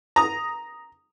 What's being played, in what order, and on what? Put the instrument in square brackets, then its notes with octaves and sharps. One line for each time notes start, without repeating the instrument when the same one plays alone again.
[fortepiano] A#5 D#6